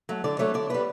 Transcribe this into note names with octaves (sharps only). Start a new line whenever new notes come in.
F#3 A3
D3 D5
F#3 A3 C#5
D3 D5
G3 B3 B4